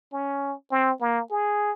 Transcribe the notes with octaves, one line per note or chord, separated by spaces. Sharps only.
C#4
C4
A#3
G#4